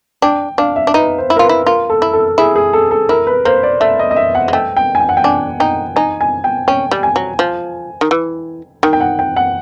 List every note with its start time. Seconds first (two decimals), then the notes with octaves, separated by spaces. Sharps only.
0.22 D4 G5
0.58 D4 F5
0.76 E5
0.87 D4
0.94 D#4 B4
1.18 C5
1.30 E4
1.36 A#4
1.39 F4 B4
1.49 E4
1.66 F4 A#4
1.90 A4
2.02 E4
2.13 A4
2.38 E4 G#4
2.56 G#4
2.73 A4
2.91 A4
3.09 E4 A#4
3.27 B4
3.45 A#3 C5
3.63 D5
3.80 A3 E5
3.99 D#5
4.11 D#5
4.16 E5
4.35 F#5
4.48 G#3
4.53 A3 G5
4.77 G5
4.95 G#5
5.00 G5
5.09 F#5
5.17 G5
5.24 D4 G#5
5.60 D#4 G5
5.96 D#4 G#5
6.21 G#5
6.44 G5
6.68 C#4 G5
6.91 G3
7.03 G#5
7.16 F#3
7.39 F3
8.01 D#3
8.11 E3
8.83 D#3 G5
8.93 G5
9.00 F#5
9.19 G5
9.36 F#5